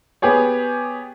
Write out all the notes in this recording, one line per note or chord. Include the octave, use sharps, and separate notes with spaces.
B3 G4 G#4 C#5